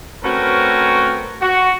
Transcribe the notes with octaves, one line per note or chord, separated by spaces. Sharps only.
A3 C4 C#4 F#4 A#4 B4
F#4